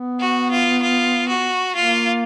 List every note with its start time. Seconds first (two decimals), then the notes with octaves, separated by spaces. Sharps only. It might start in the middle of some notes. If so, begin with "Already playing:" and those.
Already playing: B3
0.20 F#4
0.51 F4
0.82 F4
1.29 F#4
1.75 A#3 F4